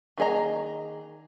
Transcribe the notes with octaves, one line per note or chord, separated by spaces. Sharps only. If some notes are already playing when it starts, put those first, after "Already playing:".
D#3 A#3 G#4 D#5 A#5